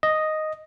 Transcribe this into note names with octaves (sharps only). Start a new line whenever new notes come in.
D#5